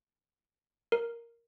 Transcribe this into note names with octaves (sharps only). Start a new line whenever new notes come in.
A#4